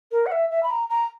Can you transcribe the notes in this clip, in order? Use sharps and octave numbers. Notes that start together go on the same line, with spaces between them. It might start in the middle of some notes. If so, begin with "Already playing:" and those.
A#4
F#5
E5
E5
B5
A#5
A#5